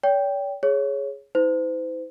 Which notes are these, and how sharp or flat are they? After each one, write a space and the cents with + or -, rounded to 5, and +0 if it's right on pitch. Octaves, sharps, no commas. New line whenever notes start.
C#5 +45 G5 +0
G#4 +0 C#5 +0
E4 -45 C5 -40